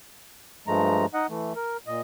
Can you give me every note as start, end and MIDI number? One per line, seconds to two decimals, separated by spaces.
0.67 1.06 43
0.67 1.06 53
0.67 1.06 56
0.67 1.06 57
0.67 1.06 82
1.14 1.27 63
1.14 1.27 75
1.14 1.27 78
1.29 1.53 52
1.29 1.53 57
1.56 1.77 70
1.87 2.02 46
1.87 2.02 75